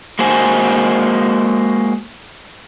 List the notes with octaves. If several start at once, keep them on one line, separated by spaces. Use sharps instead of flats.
G#3 A#3 F#4 C5 G#5